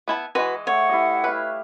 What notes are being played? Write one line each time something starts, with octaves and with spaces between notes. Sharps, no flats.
B3 E4 A5
E3 G#3 F#4 B4 D#5 C#6
A3 C#5 F#5
E4 G4 D#5
B4 E5 F5